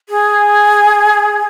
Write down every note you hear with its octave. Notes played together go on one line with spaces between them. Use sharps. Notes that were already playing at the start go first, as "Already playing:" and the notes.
G#4